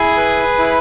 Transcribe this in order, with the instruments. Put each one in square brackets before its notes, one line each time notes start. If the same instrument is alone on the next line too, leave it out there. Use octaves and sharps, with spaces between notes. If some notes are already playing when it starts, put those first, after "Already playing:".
Already playing: [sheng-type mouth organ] E4 [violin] G#4
[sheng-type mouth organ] B4
E4